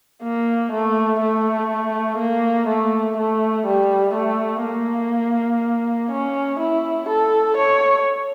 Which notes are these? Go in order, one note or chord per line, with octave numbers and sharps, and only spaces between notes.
A#3
A3
A3
A#3
A3
A3
G3
A3
A#3
C#4
E4
A4
C#5